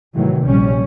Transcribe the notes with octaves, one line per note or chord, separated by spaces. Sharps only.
A2 C3 D#3 E3 F#3
A#1 G3 C#4